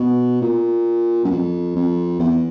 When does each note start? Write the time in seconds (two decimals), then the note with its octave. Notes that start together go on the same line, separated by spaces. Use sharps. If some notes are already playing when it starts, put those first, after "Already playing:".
Already playing: B2
0.42 A#2
1.24 F#2
1.30 F2
1.76 F2
2.20 E2